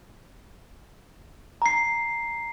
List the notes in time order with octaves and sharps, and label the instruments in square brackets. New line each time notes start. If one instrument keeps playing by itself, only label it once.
[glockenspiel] A#5 C7